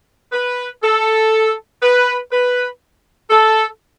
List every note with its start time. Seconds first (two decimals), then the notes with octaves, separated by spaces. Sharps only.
0.32 B4
0.82 A4
1.82 B4
2.31 B4
3.30 A4